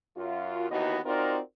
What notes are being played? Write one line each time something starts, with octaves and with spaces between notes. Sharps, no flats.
F#2 F4
D#2 E3 B3 D#4 F#4 D#5
C4 D#4 F4 F#4 A#4 D5